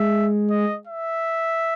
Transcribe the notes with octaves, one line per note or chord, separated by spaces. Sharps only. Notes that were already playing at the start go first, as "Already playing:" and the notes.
Already playing: G#3 E5
D#5
E5